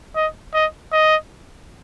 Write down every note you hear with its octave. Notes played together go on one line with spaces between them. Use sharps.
D#5
D#5
D#5